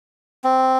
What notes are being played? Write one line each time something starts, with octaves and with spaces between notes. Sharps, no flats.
C4